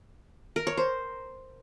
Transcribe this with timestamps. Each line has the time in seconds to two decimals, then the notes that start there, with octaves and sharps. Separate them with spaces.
0.56 A#4
0.67 C#5
0.77 C5